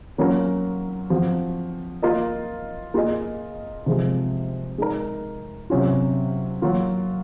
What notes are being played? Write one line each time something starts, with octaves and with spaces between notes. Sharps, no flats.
F#3 A#3 C#4 F4 A#4
F3 C4 F#4
A#3 F4 A#4 D#5
A#3 F4 G#4 D#5
C3 F3 G#3
G#3 D#4 A#4
C3 F#3 C#4 F4
F#3 A#3 F4